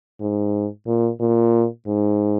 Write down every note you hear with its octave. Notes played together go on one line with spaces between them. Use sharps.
G#2
A#2
A#2
G#2